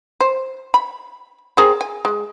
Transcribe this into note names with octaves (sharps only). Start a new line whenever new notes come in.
C5
B5
C4 G#4 A#4
G#5
G#3